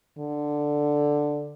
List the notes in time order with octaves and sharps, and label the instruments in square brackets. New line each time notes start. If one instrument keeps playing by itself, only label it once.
[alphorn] D3